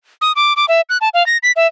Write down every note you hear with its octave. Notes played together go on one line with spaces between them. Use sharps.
D#6
D6
D6
E5
F#6
A5
F5
A#6
B6
E5